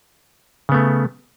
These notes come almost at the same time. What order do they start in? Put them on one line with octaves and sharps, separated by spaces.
C#3 B3 A3